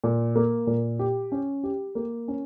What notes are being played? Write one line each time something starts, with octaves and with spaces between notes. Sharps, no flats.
A#2
A#3
A#2
G4
C#4
G4
A#3
C#4